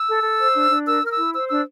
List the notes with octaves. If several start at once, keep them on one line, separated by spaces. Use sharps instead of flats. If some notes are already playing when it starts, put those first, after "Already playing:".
Already playing: E6
A4
A4
C5
D4
D4
A#4 E6
A#4 F6
E6
E4
C5 E6
D4 E6